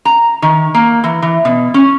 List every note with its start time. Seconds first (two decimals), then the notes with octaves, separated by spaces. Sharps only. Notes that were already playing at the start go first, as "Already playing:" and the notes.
0.05 A#5
0.42 D#3
0.75 A#3
1.04 E3
1.22 E3
1.45 B2
1.74 C#4